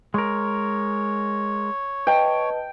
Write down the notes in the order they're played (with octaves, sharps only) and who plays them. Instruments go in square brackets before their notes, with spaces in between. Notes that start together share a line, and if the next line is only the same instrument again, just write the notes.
[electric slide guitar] G#3 A#4 [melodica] C#5
[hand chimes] B4 D#5 A5 [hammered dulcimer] G5